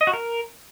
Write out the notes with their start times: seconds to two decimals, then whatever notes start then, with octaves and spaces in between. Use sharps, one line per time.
0.01 D#5
0.07 F#4
0.14 A#4